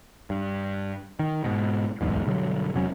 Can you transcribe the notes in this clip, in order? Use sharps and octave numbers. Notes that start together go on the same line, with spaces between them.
G2
D#3
G#2 B2
D1 B1 E2 G#2
G2 B2 D3 F#3
E1 C3 F#3 C#4